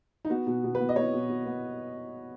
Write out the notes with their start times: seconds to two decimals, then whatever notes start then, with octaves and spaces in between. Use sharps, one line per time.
0.25 D#4
0.30 B3 F#4
0.46 B2
0.64 B2
0.75 B4
0.80 B3
0.89 D#5
0.96 B3 C#5
1.13 B2
1.29 B2
1.46 B3